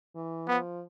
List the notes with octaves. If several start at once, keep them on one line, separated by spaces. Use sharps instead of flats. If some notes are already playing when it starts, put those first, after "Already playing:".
E3
F3 B3